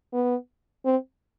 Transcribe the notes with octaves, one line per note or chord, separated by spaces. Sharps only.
B3
C4